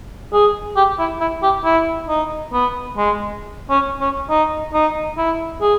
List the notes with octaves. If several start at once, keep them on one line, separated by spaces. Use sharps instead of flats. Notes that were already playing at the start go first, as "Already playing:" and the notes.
G#4
G4
E4
E4
G4
E4
D#4
B3
G#3
C#4
C#4
D#4
D#4
E4
G#4